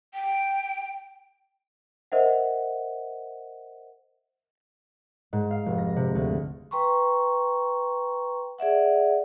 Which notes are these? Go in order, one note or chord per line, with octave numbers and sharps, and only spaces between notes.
G5
A#4 C5 D#5 E5 F#5
G#2
F5
F1
A#6
C3
D2
B4 G5 A#5 C6 C#6
G#4 D5 E5 F#5